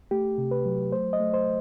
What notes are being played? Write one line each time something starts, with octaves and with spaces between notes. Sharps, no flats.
A3 G4
C3
B4
F#3
A3 C5
D#5
A3
C5